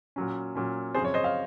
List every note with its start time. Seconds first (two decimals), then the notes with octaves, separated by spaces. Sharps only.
0.16 A#2 F#3 C#4
0.55 A#2 F#3 C#4
0.95 F#2 C#3 F3 C4 G#4 C5
1.05 C#5
1.14 C5 D#5
1.24 F5